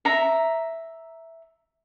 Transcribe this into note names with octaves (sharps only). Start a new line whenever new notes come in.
E5 A#5